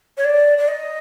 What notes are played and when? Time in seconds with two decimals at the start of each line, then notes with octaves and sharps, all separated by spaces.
0.17 C#5
0.24 D5
0.57 D5
0.68 D#5